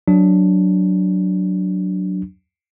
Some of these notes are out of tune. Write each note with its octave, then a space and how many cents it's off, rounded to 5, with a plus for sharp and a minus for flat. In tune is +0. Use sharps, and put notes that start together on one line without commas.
F#3 +0 D4 +0